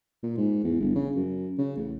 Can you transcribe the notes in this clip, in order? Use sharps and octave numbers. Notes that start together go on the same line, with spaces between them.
A#2
G#2
E2
G1
C#3
F#2
C#3
A1